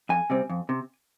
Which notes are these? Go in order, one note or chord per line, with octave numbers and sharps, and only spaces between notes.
F2 G#5
C3 G3 C4
F2
C3